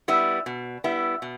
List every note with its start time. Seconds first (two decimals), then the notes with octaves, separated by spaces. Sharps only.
0.08 G3 B3 E4
0.46 B2
0.84 G3 B3 E4
1.22 B2